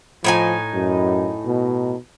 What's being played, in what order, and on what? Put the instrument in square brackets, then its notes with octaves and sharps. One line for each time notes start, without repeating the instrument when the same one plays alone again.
[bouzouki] A2 D#4 G#5 [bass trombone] F3
[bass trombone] F#2
B2